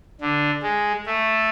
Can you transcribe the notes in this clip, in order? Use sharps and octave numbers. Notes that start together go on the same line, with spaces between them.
D3
G#3
A3